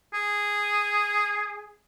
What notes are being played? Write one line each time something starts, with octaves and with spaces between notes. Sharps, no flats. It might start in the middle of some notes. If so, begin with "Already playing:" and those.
G#4